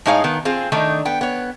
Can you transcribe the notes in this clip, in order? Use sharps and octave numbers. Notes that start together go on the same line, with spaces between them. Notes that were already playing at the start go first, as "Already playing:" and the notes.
A2 G#3 D#4 G#4 C#5 F5
D#3 B3
C4 F4 G#4
D#3 A3 D4 D#4
B3 G5
B3 C#5